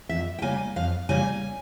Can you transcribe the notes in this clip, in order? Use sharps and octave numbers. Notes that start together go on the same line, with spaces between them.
F2 E5
G5
C#3 G3 A#3 G#5
F2 F5
C#3 G3 A#3 G#5